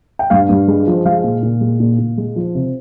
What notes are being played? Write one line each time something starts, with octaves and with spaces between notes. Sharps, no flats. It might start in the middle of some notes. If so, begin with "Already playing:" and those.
G5
G2 F5
G2
G#3
F3
G#3 F5
A#2
A#2
G#3
A#2
A#2
G#3
F3
C3